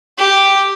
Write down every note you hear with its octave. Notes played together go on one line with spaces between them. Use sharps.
G4